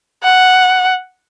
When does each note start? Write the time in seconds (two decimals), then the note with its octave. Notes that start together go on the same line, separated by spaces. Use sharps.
0.23 F#5